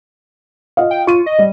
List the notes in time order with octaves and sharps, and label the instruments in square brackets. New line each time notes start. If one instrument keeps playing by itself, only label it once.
[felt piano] F4 D#5 F5
[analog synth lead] G5
[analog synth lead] F4 [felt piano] C#6 D#7
[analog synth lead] D#5
[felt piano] G3